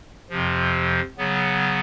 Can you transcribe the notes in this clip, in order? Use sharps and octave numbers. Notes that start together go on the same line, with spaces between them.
F2 C3 F3
C#3 F#3 B3